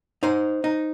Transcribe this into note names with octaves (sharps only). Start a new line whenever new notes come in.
D#4 C5
D#4